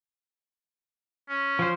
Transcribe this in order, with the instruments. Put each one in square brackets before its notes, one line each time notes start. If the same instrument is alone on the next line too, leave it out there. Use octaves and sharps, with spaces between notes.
[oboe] C#4
[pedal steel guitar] F3 C5